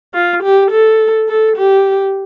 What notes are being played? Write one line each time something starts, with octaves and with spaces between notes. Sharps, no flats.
F4
G4
A4
A4
G4